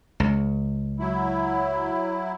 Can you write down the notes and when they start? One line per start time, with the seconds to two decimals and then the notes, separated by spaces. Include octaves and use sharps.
0.20 C#2
0.99 F#3 E4